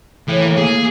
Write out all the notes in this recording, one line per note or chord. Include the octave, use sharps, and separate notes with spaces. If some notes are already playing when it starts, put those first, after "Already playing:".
A2 E3
A#3
A#3 G#4